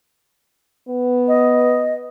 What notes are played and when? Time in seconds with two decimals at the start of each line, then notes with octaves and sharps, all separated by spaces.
0.89 B3
1.28 D#5